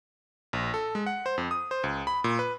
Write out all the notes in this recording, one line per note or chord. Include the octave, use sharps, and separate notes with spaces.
A#1
A4
G#3
F#5
C5
F2
D#6
C5
C#2
B5
A#2
B4